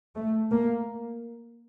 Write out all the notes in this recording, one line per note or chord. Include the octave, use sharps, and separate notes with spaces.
A3
A#3